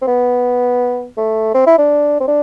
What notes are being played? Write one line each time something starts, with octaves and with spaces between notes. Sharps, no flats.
C4
B3
A3
C4
E4
D4
C4
D4